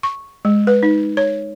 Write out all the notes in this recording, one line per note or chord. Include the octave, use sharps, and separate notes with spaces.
C#6
G#3
B4
D#4
C#5